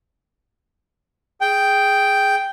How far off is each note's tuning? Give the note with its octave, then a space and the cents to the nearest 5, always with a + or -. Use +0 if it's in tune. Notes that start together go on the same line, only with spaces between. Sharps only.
G#4 +0 G5 +0